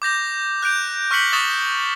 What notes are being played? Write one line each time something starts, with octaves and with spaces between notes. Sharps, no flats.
D6 G6 A#6 F7
F#6 G6 D7 F7
C#6 F6 F#6 B6 C#7 F#7
C#6 D#6 A6 E7 G7